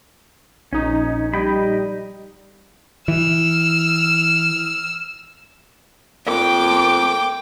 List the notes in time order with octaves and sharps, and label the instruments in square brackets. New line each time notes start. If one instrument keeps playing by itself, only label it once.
[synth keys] A#1 D#4 [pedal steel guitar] C#4
[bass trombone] G3 [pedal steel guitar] D#5 G5 B5
[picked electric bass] E3 [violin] E6 F6
[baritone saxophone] F2 [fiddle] G5 [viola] D6